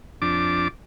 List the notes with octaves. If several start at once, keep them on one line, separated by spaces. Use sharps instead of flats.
F2 D4 D6